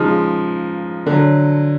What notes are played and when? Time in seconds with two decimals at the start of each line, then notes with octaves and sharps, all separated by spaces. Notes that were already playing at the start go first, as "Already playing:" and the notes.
Already playing: C#3 F3 G#3 D#4
1.06 D3 F#3